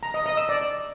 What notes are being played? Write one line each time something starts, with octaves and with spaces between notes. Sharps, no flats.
A#5
D#5
D#5
E6
D5